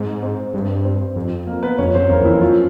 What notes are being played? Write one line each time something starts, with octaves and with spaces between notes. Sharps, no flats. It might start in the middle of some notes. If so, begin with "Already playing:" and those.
Already playing: G#2 C4 C5
C4 C5
G2
C4 C5
F2
A#3 A#4
B3 B4
F2 C#4 C#5
F#2 C4 C5
E2 A#3 A#4
E2
E3 E4
F2
F#2 F3 F4